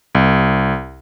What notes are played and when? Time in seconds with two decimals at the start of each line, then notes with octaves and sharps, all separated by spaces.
0.15 C2